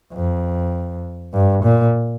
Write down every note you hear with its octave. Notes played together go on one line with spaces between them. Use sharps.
F2
G2
A#2